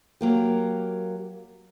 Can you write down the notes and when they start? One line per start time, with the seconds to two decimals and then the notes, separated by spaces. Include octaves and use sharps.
0.21 F#3 A#3 G4